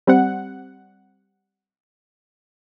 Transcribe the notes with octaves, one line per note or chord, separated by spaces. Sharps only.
G3 C4 F#5